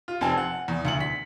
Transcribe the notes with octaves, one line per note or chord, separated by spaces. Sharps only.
F4
F1 C4 G#5 A5
F#5
E2
D2 C#7 F#7
B6